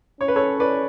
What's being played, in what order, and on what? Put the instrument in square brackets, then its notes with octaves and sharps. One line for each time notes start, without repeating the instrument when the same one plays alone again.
[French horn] C#4 [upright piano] C#5
[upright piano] B4
A4 C#5
B4 D5